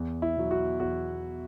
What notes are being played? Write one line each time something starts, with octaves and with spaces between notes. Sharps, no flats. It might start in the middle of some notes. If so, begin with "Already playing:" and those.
Already playing: E2
E4
B2 F#3
F#4
E2 F#4